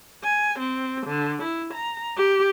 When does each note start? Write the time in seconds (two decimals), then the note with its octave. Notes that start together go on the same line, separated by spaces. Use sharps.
0.24 G#5
0.59 C4
1.07 D3
1.43 E4
1.74 A#5
2.17 G4